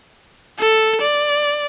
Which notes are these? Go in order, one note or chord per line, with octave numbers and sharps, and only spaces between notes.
A4
D5